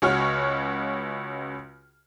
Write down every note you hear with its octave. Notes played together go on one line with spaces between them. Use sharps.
C#2 F#4 C#5 F6